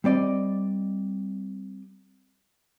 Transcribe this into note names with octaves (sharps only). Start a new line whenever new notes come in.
G3 C4 D5 D#5